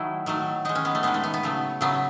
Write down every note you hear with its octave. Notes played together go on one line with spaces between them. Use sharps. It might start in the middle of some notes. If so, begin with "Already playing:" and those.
Already playing: D#3 F#3 A3 E4
D#3 F#3 A3
D#3 G#3 D#4
C#4
B3
A3
D#3 G#3 B3
A3
B3
B3
C#3 F#3 A3
C#3 F#3 A3 B3